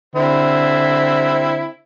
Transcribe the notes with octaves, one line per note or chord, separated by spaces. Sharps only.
D3 C4 E4